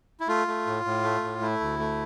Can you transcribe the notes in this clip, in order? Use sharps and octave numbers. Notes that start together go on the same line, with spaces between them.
E4
A3 F4
A3
A2
A2
A3
A2
A3 E4
D2
A3